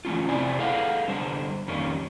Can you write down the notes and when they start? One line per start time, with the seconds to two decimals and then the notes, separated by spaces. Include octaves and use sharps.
0.05 E3 A3 C#4 F4
0.28 C3 C4 E4 C5 D5 G#5
0.59 G#4 A4 B4 F5 F#5
1.08 D3 G3 C5
1.68 F2 D#3 G3 A#3 C#4